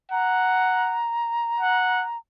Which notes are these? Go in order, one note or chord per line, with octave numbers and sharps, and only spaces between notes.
F#5 A#5
F#5